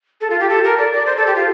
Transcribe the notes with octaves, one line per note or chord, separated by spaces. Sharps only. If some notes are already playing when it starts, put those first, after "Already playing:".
A4
F4
G4
A4
A#4
D5
D5
C5
A4
G4
F4